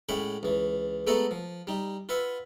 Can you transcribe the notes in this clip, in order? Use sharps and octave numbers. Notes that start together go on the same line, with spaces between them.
A2 G#3 C#4 F#5 G5 B5
C#2 E3
G#3 A3 B3 A4 F#5 A#5
F3
G3 D#4
F4 B4 E5 F#5